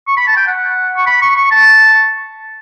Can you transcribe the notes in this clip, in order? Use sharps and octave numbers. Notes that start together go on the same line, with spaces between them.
C#6
B5
A5
G5
F#5
C#6
B5
C#6
C#6
A5